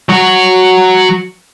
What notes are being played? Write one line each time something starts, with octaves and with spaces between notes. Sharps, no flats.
F#3 F#4